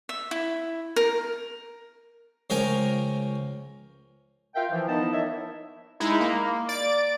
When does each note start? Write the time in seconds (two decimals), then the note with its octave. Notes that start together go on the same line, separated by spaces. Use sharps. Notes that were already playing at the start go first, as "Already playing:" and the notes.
0.09 E5
0.31 E4
0.96 A#4
2.50 C#2 F3 C#4 A#4 G5 G#5
4.55 F4 A#4 E5 F5 G5
4.71 E3 F3
4.88 A#3 B3 D#4 E4 D#5 A5
5.12 A#3 C#5 D#5 E5
6.00 G#3 D#4 E4
6.21 A#3
6.69 D5 A6 D7